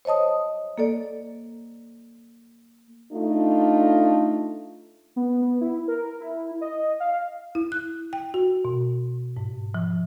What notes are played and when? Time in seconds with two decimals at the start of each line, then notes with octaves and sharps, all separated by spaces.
0.05 C5 C#5 D#5 A5 D#6
0.78 A#3 A4 D5
3.12 A3 D4 D#4 F4
5.16 B3
5.42 B3
5.61 E4
5.88 A#4
6.21 E4
6.61 D#5
7.00 F5
7.55 E4
7.72 F#6
8.13 G5
8.34 F#4
8.65 B2
9.37 G#2
9.74 F3